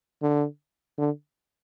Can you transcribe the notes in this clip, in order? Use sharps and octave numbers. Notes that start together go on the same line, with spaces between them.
D3
D3